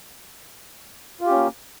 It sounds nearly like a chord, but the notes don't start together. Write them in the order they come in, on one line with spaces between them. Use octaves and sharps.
F4 G4 C#4 A#3